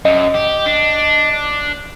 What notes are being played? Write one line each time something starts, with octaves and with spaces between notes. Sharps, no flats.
F#2 D#5
G4
D4